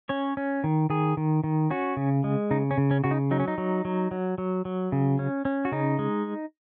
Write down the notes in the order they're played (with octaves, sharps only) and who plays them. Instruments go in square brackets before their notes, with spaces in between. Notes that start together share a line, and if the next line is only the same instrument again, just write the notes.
[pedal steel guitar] C#4 C#5
C#4
D#3
D#3 G#4
D#3
D#3
C#4 F#4
C#3
G#3
C#3 D#4
C#4
C#3
C#4
C#3 F#4
D#4
F#3 D#4
C#4
D#4
F#3
F#3
F#3
F#3
F#3
C#3
C#4
C#4
F#4
C#3 D#4
G#3